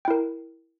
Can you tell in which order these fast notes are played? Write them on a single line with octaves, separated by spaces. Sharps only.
G5 E4 A#4